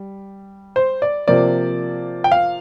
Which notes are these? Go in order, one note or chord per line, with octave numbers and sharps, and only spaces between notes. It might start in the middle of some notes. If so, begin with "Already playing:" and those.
Already playing: G3
C5
D5
C3 F3 A#3 D5
G5
F5